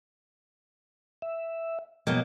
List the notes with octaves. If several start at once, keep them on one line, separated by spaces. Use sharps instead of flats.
E5
B2 F#3 A#3 D#5 G5